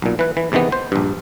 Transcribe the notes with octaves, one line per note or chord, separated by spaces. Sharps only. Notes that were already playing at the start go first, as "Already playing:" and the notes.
B1 A#2
E3 B4
E3
E2 C3 D#3 E3 B3
C5
A#1 G2